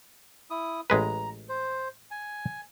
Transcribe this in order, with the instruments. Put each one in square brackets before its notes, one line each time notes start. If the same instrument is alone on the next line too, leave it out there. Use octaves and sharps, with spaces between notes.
[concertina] E4 D#6
[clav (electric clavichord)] A1 G#3 B4 [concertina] A#5
[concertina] C5
G#5